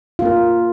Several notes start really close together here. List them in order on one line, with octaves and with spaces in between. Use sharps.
F4 A#3 A#4